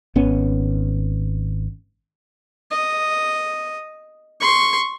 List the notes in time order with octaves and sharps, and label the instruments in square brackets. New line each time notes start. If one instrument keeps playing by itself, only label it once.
[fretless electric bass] G#1 B3 C#4
[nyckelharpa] D#5
C6 C#6